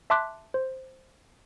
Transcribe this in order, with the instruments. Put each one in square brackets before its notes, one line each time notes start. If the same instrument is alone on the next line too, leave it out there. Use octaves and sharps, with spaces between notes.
[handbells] E5 A5 C6 D6 F#6 B6
C5